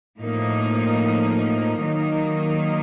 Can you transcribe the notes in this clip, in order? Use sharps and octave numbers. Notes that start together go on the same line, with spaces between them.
A2 F3 A#3 D#4
D#3 F#3 A#3 D#4